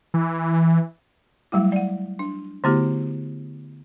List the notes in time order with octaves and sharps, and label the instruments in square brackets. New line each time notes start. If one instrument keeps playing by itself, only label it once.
[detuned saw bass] E3
[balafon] F#3 G3 A3 E4
D5 F#5
D4
D3 A3 B3 E4 F#4 G4